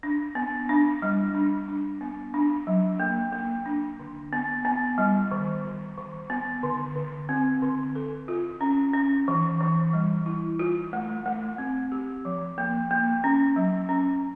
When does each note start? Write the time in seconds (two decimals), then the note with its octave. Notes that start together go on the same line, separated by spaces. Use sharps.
0.03 D4
0.35 B3
0.69 D4
1.02 G3
1.35 D4
1.68 D4
2.01 B3
2.34 D4
2.67 F#3
3.00 A#3
3.33 A#3
3.66 D4
3.99 D3
4.33 B3
4.65 B3
4.98 G3
5.31 D#3
5.64 D#3
5.97 D#3
6.30 B3
6.63 D3
6.96 D3
7.29 C4
7.62 D3
7.95 A4
8.28 F4
8.61 C#4
8.94 C#4
9.28 E3
9.60 E3
9.93 G3
10.26 E4
10.59 F4
10.93 A3
11.26 A3
11.58 C4
11.92 G4
12.25 F3
12.58 A#3
12.91 A#3
13.24 C#4
13.56 F#3
13.89 C#4